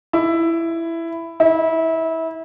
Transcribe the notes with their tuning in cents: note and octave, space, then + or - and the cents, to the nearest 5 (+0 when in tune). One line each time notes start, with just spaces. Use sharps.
E4 +10
E4 -25